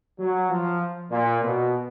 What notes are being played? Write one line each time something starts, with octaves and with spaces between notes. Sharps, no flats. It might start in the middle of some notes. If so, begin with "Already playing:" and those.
F#3
F3
A#2
B2